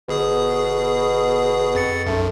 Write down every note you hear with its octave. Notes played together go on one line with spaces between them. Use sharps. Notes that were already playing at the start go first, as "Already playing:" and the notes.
G1 B2 G#4 D#6
F2 A6 C#7
B1 F#2 A3